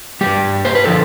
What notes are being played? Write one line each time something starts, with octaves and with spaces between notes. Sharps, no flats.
G2 E3 G3 G4
C5
B4
D3 F3 A4